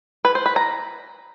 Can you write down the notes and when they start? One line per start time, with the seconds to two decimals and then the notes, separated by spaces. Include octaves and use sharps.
0.25 B4
0.35 C5
0.46 B4
0.56 A#5